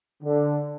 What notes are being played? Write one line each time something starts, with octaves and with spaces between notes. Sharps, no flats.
D3